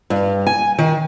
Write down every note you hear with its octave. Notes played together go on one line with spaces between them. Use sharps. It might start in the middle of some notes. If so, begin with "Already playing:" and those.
G2
G#5
D#3